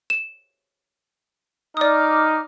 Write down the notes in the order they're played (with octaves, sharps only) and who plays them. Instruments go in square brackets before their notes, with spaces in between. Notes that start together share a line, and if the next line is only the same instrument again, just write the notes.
[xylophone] E7
[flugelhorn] D#4 [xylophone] D5 D#6 [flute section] D6 F6